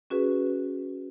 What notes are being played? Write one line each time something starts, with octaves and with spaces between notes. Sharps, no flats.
C#4 F#4 G#4 B4